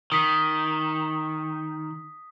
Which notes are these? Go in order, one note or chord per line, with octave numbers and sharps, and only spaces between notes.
D#3 D#6 B6